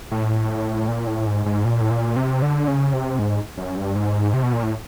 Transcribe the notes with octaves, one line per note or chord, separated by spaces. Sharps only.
A2
A#2
A2
G#2
G#2
A#2
A2
A#2
C3
D3
C#3
C3
G#2
F#2
G2
G#2
C3
B2
A#2
A2